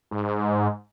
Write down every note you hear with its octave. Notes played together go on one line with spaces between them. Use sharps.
G#2